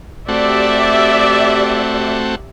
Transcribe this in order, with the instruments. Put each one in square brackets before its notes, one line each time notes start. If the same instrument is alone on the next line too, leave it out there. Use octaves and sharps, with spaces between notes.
[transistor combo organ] A3 C4 F#4 [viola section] G4 D5 E5